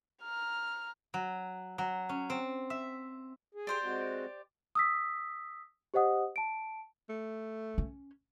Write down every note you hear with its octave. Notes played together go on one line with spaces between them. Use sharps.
A#5 F6
F#3
F#3
C#4
C4
E5
G#4
G4 C5 D5
G#3 C4 F#4
D#6 E6 B6
G4 C5 D#5 F#5 D#6
A5 D7
A3
C#4